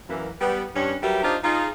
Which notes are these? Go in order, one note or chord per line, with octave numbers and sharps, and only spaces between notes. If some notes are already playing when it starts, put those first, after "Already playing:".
F#2 E3 A#3
G3 B3 B4
G2 C#4 D4
F#3 G3 G4 A#4 B4 E5
D4 D#4 F4 G4 C5 D#5
D#4 F4 G#4